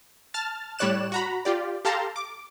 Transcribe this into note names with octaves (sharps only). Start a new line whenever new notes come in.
A5 F6 A6
A2 G3 C#5 D5 F#6 E7
F#4 A#5 B5
F4 G4 D5
G4 A4 F5 A5 A#5 C6
D6